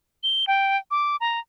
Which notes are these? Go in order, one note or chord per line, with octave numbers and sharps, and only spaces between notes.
G7
G5
D6
A#5